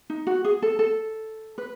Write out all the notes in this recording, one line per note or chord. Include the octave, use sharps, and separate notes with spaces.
D#4
F#4
G#4
A4
A4
B4